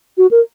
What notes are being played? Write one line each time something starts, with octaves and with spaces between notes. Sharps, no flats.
F#4
A#4